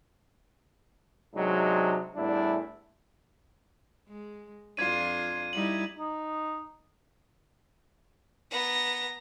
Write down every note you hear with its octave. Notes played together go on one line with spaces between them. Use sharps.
C3 F#3 G#3 D4 D#4
E2 A2 G3 D4 E4
G#3
F2 D4 F4 G#6 D#7
G3 D#4 E4 F#7
D#4
B3 A#5